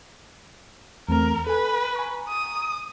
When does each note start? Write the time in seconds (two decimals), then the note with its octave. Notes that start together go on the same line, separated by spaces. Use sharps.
1.09 E2 A3 C4 A#4
1.47 A4 B4 G#5
1.96 G#5 A#5 C#6
2.29 D#6